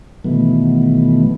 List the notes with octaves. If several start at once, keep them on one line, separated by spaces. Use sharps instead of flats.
B2 D#3 E3 F#3 A3 B3